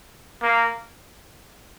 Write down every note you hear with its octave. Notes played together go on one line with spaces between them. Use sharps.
A#3